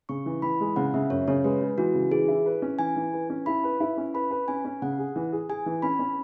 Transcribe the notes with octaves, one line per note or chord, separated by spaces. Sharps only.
C#3 C#6
E3
E3 B5
G#3
C#3 F#5
C#3 E5
F#2 C#5
C#3 C#5
G#3 B4
G#3
E3 F#4
C#3
E3 G#4
E4
B4
C#4
E3 G#5
E3
B4
C#4
E4 B5
B4
E4
C#4
B4 B5
B4
C#4 G#5
C#4
C#3 F#5
G#4
E3
G#4
G#4 G#5
E3
C#4 B5
C#4